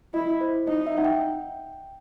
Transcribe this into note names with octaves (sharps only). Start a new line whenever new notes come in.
E4 D#5
C5
D#4 D#5
E5
F#5
G5